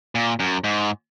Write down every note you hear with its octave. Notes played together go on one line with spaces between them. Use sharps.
A#2
F#2
G#2